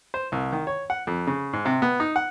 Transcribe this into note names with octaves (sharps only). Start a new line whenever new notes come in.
C5
C2
D#3
C#5
F#5
F2
C#3
G#2
C3
B3
D#4
F#5